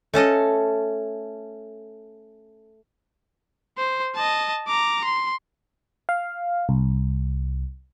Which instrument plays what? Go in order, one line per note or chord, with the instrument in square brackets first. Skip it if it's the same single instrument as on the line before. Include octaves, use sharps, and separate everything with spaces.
[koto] A3 C#4 A4 D#5
[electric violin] C5
D#5 A5
A#5 D6
C6
[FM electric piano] F5
C2